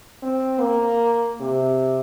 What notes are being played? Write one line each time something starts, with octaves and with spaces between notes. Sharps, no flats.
C4
A#3
C3